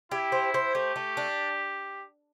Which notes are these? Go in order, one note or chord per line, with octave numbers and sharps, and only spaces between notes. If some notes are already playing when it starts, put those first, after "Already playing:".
E4 G4
C5
C5
A3 G4
A3
D4